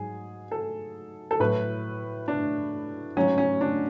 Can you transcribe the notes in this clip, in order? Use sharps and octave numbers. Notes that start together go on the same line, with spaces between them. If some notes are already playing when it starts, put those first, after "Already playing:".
Already playing: G#2 F#3 G#4
A4
A4
A2 F#3 B4
D4
G#2 F#3 C#4
C#4
D4